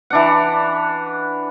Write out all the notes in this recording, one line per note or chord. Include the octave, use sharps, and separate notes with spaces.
E3 D4 F#5